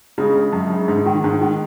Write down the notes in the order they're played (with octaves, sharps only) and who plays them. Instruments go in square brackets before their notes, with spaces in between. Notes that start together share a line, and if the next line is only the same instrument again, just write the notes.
[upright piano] C#3 G#3
C#3
F#2
C#3
G#2
D#3
G#2
D#3